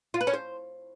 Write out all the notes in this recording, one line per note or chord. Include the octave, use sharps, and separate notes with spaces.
F4
B4
C#4
C5